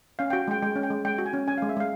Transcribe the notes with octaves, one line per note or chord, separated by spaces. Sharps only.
C#4 F5
F#4 G5
G#3 G5
G#3 G5
C#4
G5
G#3
G#3 G5
F#4
G#5
C#4
C#4 G#5
G#3 F5
E5
G#3 F5